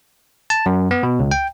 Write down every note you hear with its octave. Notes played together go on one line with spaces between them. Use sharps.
A5
F#2
B3
B2
C#2
G5